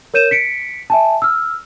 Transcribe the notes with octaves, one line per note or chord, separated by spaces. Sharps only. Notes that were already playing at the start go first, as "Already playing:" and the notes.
A#4 C#5 G6 D#7 E7
B6 C#7 D7
E5 G#5 A5
E6 F6